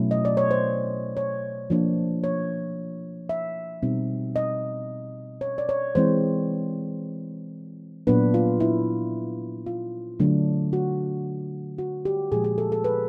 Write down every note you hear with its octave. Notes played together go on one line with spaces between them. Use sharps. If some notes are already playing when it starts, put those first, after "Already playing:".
Already playing: B2 F#3 A3 C#4 E4
D#5
D5
C#5
C5
C#5
F3 A#3 D4
C#5
E5
B2 G3 C4 D#4
D#5
C#5
D5
C#5
E3 G#3 C4 E4 C5
A#2 F#3 B3 D4 B4
F4
E4
F4
D3 F#3 A3 D4
F#4
F#4
G4
A#2 F3 G#3 G#4
G#4
A4
A4
B4